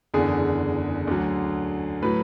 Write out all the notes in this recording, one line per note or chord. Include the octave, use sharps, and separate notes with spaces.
F#1 E2 D3 G#4
D2 D3 F#3
A2 F#3 B4